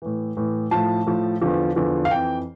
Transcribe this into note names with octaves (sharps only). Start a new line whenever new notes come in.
A2 E3
A2 E3
A2 F3 A5
A2 F3
E2 D3 F3
E2 D3 F3
F5
F2 E3 G5